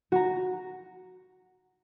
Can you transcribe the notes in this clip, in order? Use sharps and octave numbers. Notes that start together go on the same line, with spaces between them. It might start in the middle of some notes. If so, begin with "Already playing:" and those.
F#4 A#5